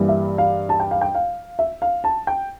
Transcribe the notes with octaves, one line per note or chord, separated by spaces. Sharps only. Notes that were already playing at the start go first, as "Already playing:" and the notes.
Already playing: G2 E3 G3 A#3
E5
F5
A5
G5
F5
G5
F5
E5
F5
A5
G5